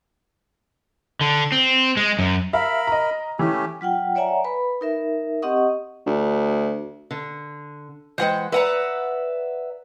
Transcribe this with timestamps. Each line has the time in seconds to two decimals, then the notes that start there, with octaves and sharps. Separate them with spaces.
1.21 D3
1.52 C4
1.97 G#3
2.19 F#2
2.53 A#4 E5 F5 B5
2.87 D#5 A#5
3.39 E3 A3 C#4 G4
3.81 F#3 F4 F#5 G5
4.15 C#5 D5 E5 F#5 G#5 A#5
4.44 B4 B5
4.81 D#4 A#4 E5
5.42 C4 G4 D#5 F#5 C#6 D#6
6.06 D2
7.11 D3
8.18 E3 G#3 C5 F#5 G5
8.52 B4 D5 E5 F#5 A#5